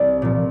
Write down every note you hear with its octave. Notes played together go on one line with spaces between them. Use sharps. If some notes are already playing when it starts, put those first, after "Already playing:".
Already playing: C2 D5
A#2 F3